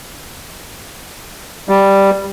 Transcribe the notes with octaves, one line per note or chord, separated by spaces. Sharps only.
G3